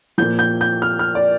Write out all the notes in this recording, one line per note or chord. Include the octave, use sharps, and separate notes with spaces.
A#2 F3 G6
G6
G6
F6
F6
D5